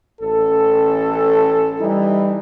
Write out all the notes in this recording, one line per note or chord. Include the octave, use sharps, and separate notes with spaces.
A1 C#4 A4
E3 G3 D#4 E4